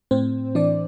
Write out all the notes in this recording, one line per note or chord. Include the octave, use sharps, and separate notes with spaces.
A2 C4 C5
E3 D4 D5